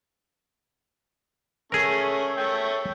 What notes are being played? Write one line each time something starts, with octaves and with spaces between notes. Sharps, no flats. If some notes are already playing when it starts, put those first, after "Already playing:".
A3 C#4 G#4 A#4
A3 C#5 G5